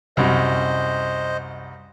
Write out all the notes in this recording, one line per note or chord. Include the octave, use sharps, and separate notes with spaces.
C2 F#2 C5 D#5